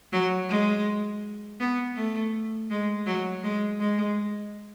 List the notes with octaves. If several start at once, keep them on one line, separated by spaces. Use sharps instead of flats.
F#3
G#3
B3
A3
G#3
F#3
G#3
G#3